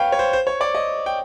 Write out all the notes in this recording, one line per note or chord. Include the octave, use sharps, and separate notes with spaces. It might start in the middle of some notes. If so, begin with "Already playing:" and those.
Already playing: B4 C#5 F5 G5
C#5
C5
C5
C#5
D5
D#5
G5